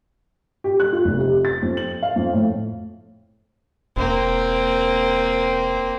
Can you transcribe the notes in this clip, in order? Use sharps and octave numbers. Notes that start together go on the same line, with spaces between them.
G4
F#6
F4
F1
C3
A6
F2
F#7
F5
F2
A2
E1 A#3 C4